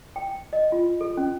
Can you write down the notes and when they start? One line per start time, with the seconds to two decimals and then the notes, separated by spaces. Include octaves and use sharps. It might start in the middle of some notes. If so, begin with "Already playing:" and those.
0.16 G5
0.53 D#5
0.72 F4
1.01 A4
1.17 C#4